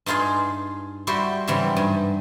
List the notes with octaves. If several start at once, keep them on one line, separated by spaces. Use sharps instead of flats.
G2 D#4 F4 G#4 F5
G3 E4 F#4 G4 C5
G#2 C#3 E3 F#3 G3
G2